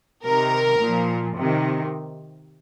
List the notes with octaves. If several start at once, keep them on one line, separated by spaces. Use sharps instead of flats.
C3 D#3 A#4
A#2 F3
C3 D#3